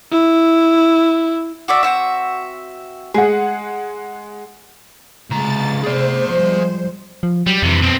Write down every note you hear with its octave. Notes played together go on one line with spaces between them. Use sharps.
E4
F#4 D5 E5
C4 F#4 E5
G#3 G#4 F#5
C#2 C3 G#3 A#5 A6
C3 A3 G#4 C5 D5
F3 G3 G#3
F3
F#3 G3
F2 C3 E3
B1 C4